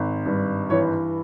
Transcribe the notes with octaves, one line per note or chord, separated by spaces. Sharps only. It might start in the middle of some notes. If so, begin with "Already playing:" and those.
Already playing: G#1
G2
E3 C#5